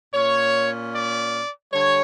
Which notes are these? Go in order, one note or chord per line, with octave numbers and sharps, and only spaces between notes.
A#2 A#3 C#4 C#5
D5
D3 G3 C#5